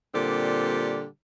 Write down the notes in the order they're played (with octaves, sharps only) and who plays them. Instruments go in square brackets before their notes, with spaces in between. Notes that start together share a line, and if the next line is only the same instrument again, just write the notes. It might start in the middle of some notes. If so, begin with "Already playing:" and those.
[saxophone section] A#2 D3 G3 C4 G4